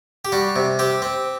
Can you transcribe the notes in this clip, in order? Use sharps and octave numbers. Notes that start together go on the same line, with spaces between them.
G4
G3 F#4
C3
C4 G4
C4